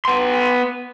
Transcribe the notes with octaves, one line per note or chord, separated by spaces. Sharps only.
B3 C6